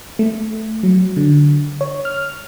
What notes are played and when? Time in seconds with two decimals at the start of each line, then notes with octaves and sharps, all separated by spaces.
0.19 A3
0.83 F#3
1.17 D3
1.81 C#5
2.05 F6